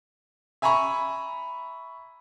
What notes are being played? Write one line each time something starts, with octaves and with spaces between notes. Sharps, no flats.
E5 G#5 A#5 B5 C#6